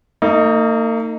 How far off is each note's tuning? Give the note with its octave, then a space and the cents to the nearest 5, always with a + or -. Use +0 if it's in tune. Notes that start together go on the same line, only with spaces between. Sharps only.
A#3 -45 D#4 +0